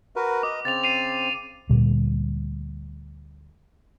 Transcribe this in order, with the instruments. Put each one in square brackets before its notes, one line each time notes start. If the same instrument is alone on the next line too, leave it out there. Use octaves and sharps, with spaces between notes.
[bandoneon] F#4 A#4 B4
[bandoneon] D#5 [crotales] D6
[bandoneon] C#3 C4 [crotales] A6 F7
[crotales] C7 D#7 F7
[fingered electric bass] D2 A#2 G3